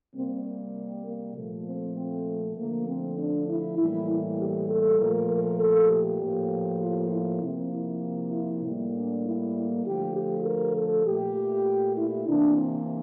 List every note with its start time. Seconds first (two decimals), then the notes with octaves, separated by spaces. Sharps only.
0.15 C3 G3 A#3 C4
0.46 A#3
1.07 A#3
1.37 A#2 F3 A3
1.68 C4
1.97 C4
2.57 D3 F3 A3 A#3
2.88 C4
3.19 D4
3.49 E4
3.79 A2 E3 G3 A#3 E4
4.40 G4
4.70 A4
5.00 A#2 F3 A3 A#4
5.31 A#4
5.61 A4
5.91 G4
6.22 A2 F3 A#3
6.82 F4
7.12 E4
7.43 C3 F3 A#3 C4
7.73 E4
8.33 E4
8.64 A2 G3 A#3
8.95 D4
9.25 E4
9.86 D3 F3 A3 G4
10.16 G4
10.46 A#4
10.77 A4
11.06 A#2 A3 G4
11.97 E4
12.28 C3 E3 A#3 D4
12.58 C4